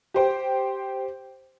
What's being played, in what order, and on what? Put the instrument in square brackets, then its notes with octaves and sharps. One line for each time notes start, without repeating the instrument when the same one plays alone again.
[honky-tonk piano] G4 C5 G5